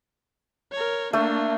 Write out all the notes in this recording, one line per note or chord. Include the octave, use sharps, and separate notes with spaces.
A#4 C#5
A3 A#3 D4